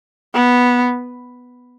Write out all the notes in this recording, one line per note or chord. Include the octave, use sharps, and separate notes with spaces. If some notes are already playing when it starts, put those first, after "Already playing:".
B3